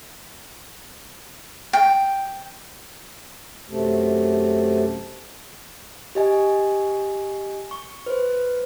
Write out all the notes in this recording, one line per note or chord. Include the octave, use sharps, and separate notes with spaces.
G5
F#2 C3 A3
G4 D#5 G#5
C#6
B4 C5